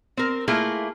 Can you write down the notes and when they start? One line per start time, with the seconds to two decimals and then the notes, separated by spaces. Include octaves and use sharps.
0.17 C4 A#4
0.48 A3 A#3 E4 F4 G#4